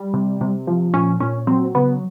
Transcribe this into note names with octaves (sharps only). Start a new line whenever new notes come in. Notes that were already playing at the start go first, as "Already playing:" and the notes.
Already playing: G3
C3
C3
F3
A#2 C#4
A#2 C#4
F#3 C4
C#3 B3